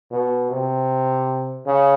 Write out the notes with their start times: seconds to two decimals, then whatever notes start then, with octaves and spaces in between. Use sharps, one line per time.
0.11 B2
0.51 C3
1.66 C#3